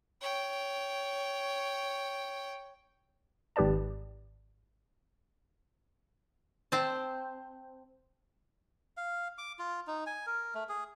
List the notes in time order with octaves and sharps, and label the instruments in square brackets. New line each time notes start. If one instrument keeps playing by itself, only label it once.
[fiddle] C#5 G5
[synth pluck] G#1 G#2 G4 B4 D5 A5
[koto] C4 C5 A5
[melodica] F5
D6
F4
D#4
G#5
A#4
A3
G#4